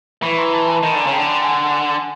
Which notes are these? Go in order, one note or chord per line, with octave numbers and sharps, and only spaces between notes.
E3 B5 C#6
A#5 C6
A5 B5
G#5 A#5
D#3 A#5
D3 A5
C#3 G#5
D3 G5 A5
F#5 G#5